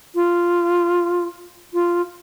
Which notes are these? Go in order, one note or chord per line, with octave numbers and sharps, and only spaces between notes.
F4
F4